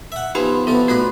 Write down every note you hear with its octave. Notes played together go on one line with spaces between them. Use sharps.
E5 F#5
F3 B3 D#4 G4 B5
C3 F3 B3 F4 A4
A3 D#4 F4 F#4 B4